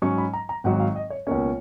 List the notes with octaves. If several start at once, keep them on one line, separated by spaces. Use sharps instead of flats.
G#2 F#3 C#4 C#6
B5
A#5
A#5
G#1 G#2 F#3 F#5
F5
D#5
C#5
C#2 B2 A#3 C#4 C#5